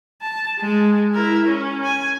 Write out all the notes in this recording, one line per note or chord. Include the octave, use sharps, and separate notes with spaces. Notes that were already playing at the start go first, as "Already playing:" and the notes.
A5
G#3
E4 A#4
C#4
G#5